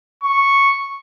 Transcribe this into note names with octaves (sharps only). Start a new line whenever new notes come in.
C#6